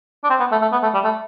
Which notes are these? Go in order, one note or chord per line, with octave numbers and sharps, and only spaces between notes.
D4
C4
B3
A3
A3
B3
A3
G3
A3